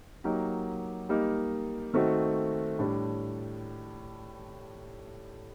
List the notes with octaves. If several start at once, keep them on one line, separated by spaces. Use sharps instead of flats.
F#3 A#3 D#4 G4
G3 A#3 D#4
D#3 A3 C4 F#4
A2 G3 D4